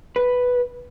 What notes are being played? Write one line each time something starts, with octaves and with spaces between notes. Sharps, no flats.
B4